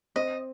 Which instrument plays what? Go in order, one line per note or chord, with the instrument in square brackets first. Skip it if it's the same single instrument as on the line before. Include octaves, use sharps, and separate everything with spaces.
[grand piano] C4 [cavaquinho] D#5